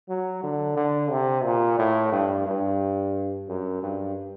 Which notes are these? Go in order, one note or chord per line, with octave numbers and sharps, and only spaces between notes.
F#3
D3
D3
C3
A#2
A2
G2
G2
F#2
G2